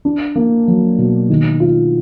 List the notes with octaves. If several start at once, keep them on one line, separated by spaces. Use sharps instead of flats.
D4
A#3
F#3
B2
D#3
F4